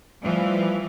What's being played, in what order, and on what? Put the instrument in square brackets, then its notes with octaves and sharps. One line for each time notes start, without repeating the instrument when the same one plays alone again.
[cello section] E3 F3 [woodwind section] G3 A3